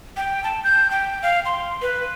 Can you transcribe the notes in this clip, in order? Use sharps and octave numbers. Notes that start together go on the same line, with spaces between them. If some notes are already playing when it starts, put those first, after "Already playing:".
G5
A5
G6
G5
F5
C6
B4